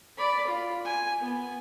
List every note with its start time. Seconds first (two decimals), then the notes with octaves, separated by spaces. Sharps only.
0.17 D5 B5
0.47 F4
0.84 G#5
1.19 B3